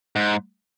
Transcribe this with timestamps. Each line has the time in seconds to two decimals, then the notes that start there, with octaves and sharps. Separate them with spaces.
0.16 G#2